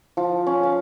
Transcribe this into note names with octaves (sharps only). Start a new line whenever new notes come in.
F3
C#4
F5